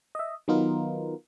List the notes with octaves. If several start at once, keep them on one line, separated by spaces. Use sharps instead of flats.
D#5 E5
D#3 F#3 B3 D#4 F4 A#4